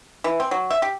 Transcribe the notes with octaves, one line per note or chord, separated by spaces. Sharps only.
E3
C4
F#3
E5
G4